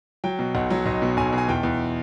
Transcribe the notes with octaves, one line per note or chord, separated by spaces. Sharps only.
F#3 G5
B2
B1 F#5
F#3
B1 D#5
B2
B1 G#5
B2 G#5
E2 G5
E2